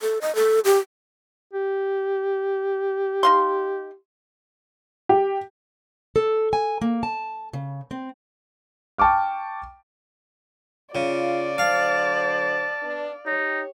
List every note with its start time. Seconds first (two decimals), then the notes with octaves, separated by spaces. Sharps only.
0.01 A4
0.22 D#5
0.35 A4
0.65 G4
1.53 G4
3.23 D#4 F5 C6
5.09 G4
6.16 A4
6.53 G#5
6.81 A#3
7.03 A5
7.53 C#3
7.91 C4
8.98 G5 A5 C#6 D6 F6
10.95 C#3 F4 D5
11.58 D3 F#3 C5 F5 A5
12.83 B3 D4
13.26 D#4 G4 C#5